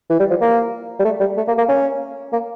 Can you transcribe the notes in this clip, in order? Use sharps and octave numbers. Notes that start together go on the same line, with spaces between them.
E3
G3
F3
A#3
G3
A3
G3
A3
A#3
A#3
C#4
A#3